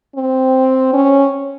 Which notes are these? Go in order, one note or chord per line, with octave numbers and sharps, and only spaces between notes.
C4
C#4